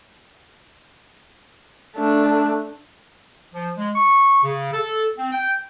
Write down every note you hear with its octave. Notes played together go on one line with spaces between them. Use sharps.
A3 D4
F3
G#3
C#6
C#3
A4
C4
G5